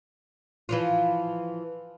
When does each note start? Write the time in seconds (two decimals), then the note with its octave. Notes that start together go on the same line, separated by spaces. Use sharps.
0.69 E3 F3 F4